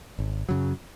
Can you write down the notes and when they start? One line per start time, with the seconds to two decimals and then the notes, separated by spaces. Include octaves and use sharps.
0.19 G#1
0.49 F#2 C#3 F#3